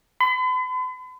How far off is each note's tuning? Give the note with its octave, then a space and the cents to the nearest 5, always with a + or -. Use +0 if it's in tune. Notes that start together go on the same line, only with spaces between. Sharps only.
B5 +45